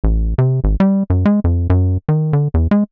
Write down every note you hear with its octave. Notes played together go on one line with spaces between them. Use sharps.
A1
C3
G#1
G3
F#2
G#3
F2
F#2
D#3
D3
E2
G#3